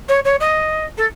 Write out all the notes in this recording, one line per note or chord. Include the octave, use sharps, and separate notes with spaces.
C#5
C#5
D#5
A4